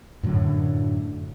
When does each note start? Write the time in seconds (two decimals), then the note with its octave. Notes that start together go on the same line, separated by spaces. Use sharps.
0.23 F#2 A2 D3 F#3